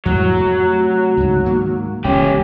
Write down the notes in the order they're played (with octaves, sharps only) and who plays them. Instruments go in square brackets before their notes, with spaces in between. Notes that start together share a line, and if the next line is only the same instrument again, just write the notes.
[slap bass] F2 A2 G#3 [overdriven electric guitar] F#3
[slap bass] C3 A3
C#2 G#2
G#2 D#3 A#3
[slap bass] E1 C#2 [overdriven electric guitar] C#4 G4